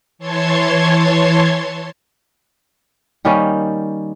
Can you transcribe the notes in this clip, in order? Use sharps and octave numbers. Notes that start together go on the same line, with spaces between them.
E3 C#5 A5 C6 G#6
D#3 G3 A#3 C#4